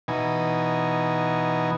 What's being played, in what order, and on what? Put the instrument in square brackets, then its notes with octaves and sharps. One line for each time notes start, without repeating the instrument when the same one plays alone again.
[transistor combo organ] B2 E3 D#4 G#5